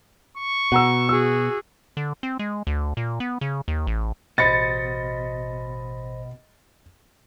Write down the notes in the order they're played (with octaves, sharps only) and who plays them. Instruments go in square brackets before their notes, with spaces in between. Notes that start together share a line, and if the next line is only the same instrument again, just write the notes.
[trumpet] C#6
[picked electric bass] B2 [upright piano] F#5 A#5 E6
[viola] F#4 G#4 [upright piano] E6
[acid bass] D3
C4
G#3
D2
A#2
B3
C#3
D#2
A1
[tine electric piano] A1 C5 A#6 [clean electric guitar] B2 [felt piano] D#5 B5 [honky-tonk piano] A6 C#7